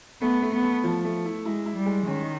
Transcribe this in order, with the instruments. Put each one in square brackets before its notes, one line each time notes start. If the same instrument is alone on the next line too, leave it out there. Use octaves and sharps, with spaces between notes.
[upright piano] A3 [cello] B3
[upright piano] A3
[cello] B3
[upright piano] A3
F3
A3
E4
[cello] G#3 [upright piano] E4
[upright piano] E4
[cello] G3
[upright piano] G#3
[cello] D#3 [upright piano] C#4